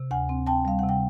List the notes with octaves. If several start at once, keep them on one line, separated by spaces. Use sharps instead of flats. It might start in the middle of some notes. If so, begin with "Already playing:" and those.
Already playing: C3
D2 F#5 G#5
C4
C4 G5 A5
G3 F5
C3 F#5
G5